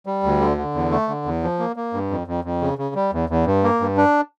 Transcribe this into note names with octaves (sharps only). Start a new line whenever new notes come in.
G3
D2
D3
D3
E2
A3
D3
E2
F3
A#3
A#3
G2
F2
F2
F2
C#3
C#3
G3
E2
E2
G2
A#3
G2
D4